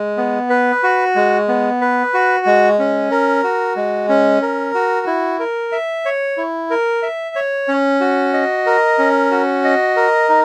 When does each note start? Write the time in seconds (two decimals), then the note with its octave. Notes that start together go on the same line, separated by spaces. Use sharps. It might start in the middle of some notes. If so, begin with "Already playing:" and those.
Already playing: G#3
0.17 B3
0.50 B4
0.83 F#4
1.16 G#3
1.48 B3
1.81 B4
2.14 F#4
2.46 G#3
2.79 C#4
3.11 A#4
3.44 F#4
3.76 G#3
4.09 C#4
4.42 A#4
4.74 F#4
5.07 E4
5.39 A#4
5.72 E5
6.05 C#5
6.37 E4
6.70 A#4
7.03 E5
7.36 C#5
7.68 C#4
8.00 F#4
8.33 D#5
8.66 A#4
8.98 C#4
9.31 F#4
9.64 D#5
9.96 A#4
10.29 D#4